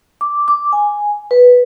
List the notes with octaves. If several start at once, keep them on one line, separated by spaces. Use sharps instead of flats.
D6
D6
G#5
B4